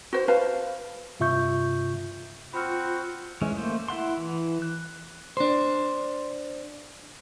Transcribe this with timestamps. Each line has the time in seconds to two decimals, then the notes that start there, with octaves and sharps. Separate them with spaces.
0.13 F#4 C5
0.28 B4 C5 F5 A5
1.20 G2 C3 F4 E5 C#6 G6
2.53 C4 F4 F#4 C5 B5 C#6 F6
3.42 E3 G#3 C#4
3.56 A3 A#3 C5
3.88 E4 E5 F#5 C6
4.17 E3
4.62 F#6
5.37 D4 C5